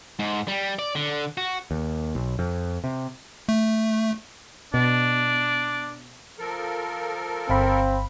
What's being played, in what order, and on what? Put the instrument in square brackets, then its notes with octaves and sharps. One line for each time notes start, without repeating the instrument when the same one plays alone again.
[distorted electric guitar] G#2
G3
D5
D3
F#4
[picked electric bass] D#2
B1
F2
C3
[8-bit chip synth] A3
[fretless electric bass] B2 [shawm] D4
[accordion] F3 A4 A#4
[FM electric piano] G1 F5 B5 [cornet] C4